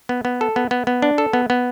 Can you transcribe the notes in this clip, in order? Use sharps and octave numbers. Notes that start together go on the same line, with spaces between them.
B3
B3
A4
B3
B3
B3
D4
A4
B3
B3